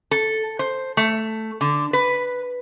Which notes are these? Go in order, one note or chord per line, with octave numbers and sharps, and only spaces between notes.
A4
C5
A3
D3
B4